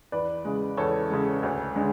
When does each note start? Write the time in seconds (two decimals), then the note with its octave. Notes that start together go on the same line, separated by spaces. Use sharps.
0.12 E2 B4 D5
0.45 C#3 G#3
0.77 E2 A4 C#5
1.10 C#3 G#3
1.43 D2
1.76 D3 G#3